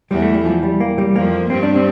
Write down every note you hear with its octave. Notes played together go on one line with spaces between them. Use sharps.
E2 E3 G3
A3
G3
F3
G3
A#3
G3
F2 F3 A#3
G2 G3 C4
D4
C4